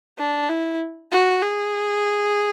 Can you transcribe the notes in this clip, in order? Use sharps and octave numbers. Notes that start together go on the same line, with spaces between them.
D4
E4
F#4
G#4